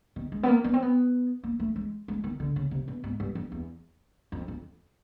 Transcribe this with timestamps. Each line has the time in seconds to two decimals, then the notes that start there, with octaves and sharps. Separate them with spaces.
0.16 D#3
0.32 G#3
0.43 B3
0.48 A#3
0.64 B3
0.73 C4
0.82 B3
1.43 A#3
1.60 A3
1.76 G#3
2.08 G#3
2.24 D#3
2.40 D3
2.56 C#3
2.71 C3
2.88 B2
3.04 G#2
3.20 G2
3.35 F2
3.52 E2
4.32 F2
4.48 F2